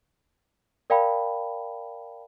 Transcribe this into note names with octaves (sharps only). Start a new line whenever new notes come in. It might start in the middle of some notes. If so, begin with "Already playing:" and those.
A#4 D5 F5 G5 A5 B5